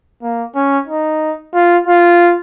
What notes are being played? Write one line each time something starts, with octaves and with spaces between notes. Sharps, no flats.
A#3
C#4
D#4
F4
F4